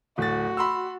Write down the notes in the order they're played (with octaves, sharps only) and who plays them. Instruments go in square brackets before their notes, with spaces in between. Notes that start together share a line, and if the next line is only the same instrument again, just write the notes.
[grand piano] D1 A6 [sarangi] F#4
[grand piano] B5 C6 E6